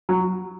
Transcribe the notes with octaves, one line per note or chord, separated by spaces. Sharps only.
F#3